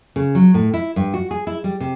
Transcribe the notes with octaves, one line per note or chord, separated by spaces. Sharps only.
C#3
F#3
A2
E4
G2
F#4
G#4
E4
G3
C3